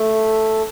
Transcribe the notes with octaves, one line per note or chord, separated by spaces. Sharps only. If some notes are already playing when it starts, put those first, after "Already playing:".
Already playing: A3